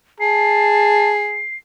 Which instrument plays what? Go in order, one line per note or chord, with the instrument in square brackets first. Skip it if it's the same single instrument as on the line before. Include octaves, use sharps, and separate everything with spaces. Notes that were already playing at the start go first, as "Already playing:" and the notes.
[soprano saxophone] G#4 [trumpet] A5 [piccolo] C7